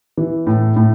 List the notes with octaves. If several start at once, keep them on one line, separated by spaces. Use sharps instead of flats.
E3
A2
A2